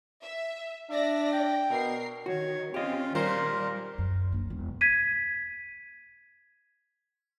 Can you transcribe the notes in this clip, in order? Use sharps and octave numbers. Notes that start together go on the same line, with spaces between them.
E5
D4 D5 E5 A#6
G5
B2 A#4 C7
D#3 F#4 C#5
C4 C#4 F4 G4 D#5
A#2 D#3 G3 A#4 C5
F#2
F#1 D4
E1
G#6 B6 D#7